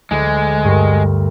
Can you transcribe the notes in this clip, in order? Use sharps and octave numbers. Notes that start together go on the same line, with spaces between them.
D2 G#3
G2 A#4